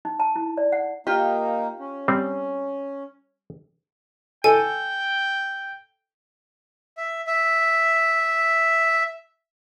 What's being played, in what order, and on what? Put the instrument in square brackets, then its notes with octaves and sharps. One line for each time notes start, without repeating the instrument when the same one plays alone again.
[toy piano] D#4
A5
E4
D5
F#5
[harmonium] A#3 D#4 [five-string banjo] F4 G4
[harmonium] C#4
[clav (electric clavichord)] G3 C4
[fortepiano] A4 [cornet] G5 [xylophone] G#5
[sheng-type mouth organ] E5
E5